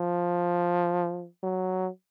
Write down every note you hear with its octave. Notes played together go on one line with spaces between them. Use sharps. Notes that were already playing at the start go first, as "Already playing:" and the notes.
Already playing: F3
F#3